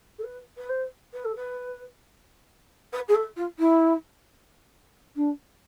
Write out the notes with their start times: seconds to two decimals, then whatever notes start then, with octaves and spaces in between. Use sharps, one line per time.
0.19 A4
0.24 B4
0.57 B4
0.69 C5
1.14 B4
1.25 A4
1.36 B4
2.93 B4
3.08 G#4
3.15 A4
3.37 F4
3.59 E4
5.16 D4